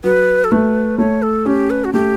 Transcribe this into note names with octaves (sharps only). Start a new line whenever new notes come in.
F#3 B4
A4
A3 B4
A3 C#5
A4
C#4 G4
B4
F#4
A3 G4